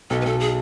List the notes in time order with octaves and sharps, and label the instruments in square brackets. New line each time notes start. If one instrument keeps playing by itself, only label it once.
[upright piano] B1 [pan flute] A4
[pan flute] B4
[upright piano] B1 [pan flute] A4
[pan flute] G#4